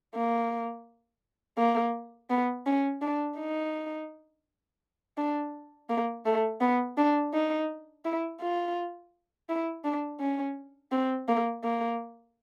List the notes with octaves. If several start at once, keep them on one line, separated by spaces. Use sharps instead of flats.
A#3
A#3
B3
C#4
D4
D#4
D4
A#3
A3
B3
D4
D#4
E4
F4
E4
D4
C#4
C4
A#3
A#3